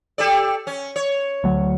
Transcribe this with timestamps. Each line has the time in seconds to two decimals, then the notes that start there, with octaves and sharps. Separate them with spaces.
0.18 G4 A4 D5
0.67 C#4
0.96 C#5
1.44 D2 F#3